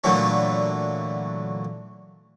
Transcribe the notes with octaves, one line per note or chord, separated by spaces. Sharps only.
A#2 D3 E3 F#3 A3